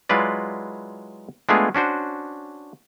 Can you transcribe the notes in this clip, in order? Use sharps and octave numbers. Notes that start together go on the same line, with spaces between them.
F#3 G#3 E4 F4 B4 D5
G#3 A3 B3 D4 F4 G#4
C#4 D4 F#4 C5